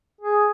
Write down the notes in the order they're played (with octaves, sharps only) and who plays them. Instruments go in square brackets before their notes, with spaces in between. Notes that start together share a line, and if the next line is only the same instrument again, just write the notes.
[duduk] G#4